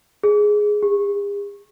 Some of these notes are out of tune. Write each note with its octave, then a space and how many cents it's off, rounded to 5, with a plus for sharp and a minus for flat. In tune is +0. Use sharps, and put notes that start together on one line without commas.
G#4 +5
G#4 -45